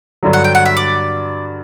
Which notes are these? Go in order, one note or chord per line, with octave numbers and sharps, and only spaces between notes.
G2 D3 F#3
F#5
G5
F#5
E5
D5